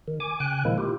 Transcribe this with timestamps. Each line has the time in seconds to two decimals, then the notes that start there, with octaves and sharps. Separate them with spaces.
0.08 D#3
0.20 G#5 D6
0.40 C#3 G5 G#5 F#6
0.65 A#2 D#3 F3 G#3 A#3 E4
0.78 E4 F4 G4